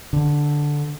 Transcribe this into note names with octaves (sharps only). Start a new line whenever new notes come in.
D3